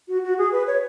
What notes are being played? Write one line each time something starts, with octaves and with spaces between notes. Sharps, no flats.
F#4
F#4
G#4
B4
C#5